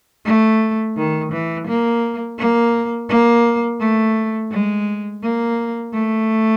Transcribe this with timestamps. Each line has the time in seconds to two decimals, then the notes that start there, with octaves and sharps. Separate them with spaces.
0.25 A3
0.97 D#3
1.32 E3
1.67 A#3
2.38 A#3
3.09 A#3
3.80 A3
4.51 G#3
5.22 A#3
5.93 A3